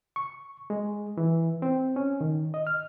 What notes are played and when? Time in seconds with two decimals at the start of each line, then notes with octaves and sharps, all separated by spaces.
0.16 C#6
0.70 G#3
1.18 E3
1.62 C4
1.96 C#4
2.21 D#3
2.54 D#5
2.67 F6